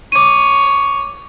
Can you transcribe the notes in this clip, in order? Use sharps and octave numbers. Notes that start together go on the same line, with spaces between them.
C#5 D6 D#7